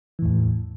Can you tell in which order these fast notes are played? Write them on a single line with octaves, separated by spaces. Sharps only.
E3 A2 E2